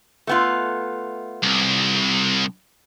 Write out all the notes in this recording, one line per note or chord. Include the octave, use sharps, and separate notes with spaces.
A3 B3 F4
C2